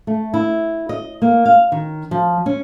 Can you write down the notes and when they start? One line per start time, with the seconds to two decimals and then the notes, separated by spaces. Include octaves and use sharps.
0.07 A3
0.34 E4
0.89 D#5
1.22 A#3
1.45 F5
1.72 D#3
2.11 F3
2.46 C#4